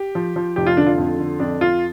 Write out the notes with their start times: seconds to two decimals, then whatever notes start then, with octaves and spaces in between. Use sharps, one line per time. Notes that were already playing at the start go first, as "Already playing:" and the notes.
Already playing: G4
0.15 F3
0.36 F3
0.56 F1 G4
0.66 F4
0.77 D3 D4
0.87 F4
0.98 F2
1.19 D3
1.40 F2 D4
1.60 F2 F4